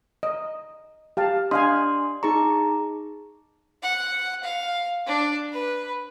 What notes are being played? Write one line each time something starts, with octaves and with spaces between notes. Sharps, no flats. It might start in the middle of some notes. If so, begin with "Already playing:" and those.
D#5
G4 F5 A5
D4 D#5 F5 G#5 C6
D#4 G#4 A#5 C#6
F#5
F5
D4
B4